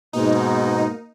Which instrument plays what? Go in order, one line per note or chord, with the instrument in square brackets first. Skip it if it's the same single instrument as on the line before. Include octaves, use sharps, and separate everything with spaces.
[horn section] G#2 B2 [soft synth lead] A#3 [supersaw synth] D#4